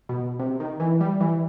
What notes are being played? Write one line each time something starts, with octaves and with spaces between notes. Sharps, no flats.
B2
C3
D#3
E3
G3
E3